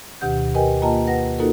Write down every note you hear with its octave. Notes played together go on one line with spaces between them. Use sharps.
D2 B2 D#3 G4 F#5 G6
G4 A#4 B4 D#5 G5 G#5
A#3 F4 D#5 G5 A5 A#5
B4 F#5 A#6
A#3 D#4 F4 F#4 A4 A#4